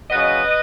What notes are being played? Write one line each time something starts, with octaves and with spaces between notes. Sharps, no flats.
C#3 F#3 B3 B4 D#5